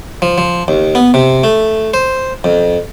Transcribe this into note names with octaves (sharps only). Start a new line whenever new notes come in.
F3
F3
D#2
B3
C3
A3
C5
F2